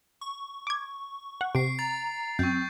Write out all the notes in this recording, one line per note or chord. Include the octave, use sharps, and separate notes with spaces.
C#6
D6 G#6
F#5
C3 C7 D7
A#5 A6
F#2 C4 C#6 G6